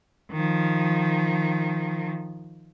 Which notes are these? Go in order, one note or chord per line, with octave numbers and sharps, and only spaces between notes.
D#3 F3